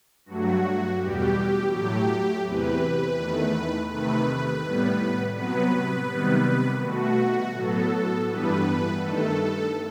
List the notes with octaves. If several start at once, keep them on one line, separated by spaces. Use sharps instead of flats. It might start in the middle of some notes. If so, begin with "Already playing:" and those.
G2 F#3 A3 F#4
E2 B2 G3 G4
A2 F#3 A3 G4
E2 C3 E3 B4
E2 D#3 A3
C3 D#3 A3 B4
A2 G3 B3
C3 F#3 B3 B4
C3 D#3 G3 B3
B2 A3 F#4
A2 F#3 B3 A4
G2 E3 G3 B3 B4
G2 D#3 A3 A4